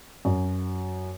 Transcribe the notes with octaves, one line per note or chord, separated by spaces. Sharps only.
F#2